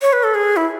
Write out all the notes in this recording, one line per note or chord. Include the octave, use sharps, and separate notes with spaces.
C#5
B4
A4
G#4
E4